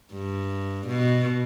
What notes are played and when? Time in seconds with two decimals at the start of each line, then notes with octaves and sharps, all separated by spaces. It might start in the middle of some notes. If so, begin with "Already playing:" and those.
0.13 G2
0.87 B2